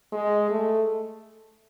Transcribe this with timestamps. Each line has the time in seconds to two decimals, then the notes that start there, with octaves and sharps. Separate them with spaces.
0.13 G#3
0.50 A3